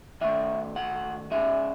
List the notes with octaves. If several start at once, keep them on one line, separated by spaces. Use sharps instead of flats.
D#3 A3 E5
F#5
C#3 G#3 E5